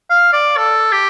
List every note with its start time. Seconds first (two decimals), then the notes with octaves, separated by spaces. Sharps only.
0.10 F5
0.33 D5
0.57 A4
0.92 G4